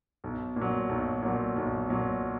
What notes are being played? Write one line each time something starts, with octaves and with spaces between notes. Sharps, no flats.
B1
A#2
F#3
B1
A#2 F#3
B1
A#2 F#3